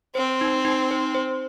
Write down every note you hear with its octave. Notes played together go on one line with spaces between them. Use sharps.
C4 C5
D#4
D#4
C5
C5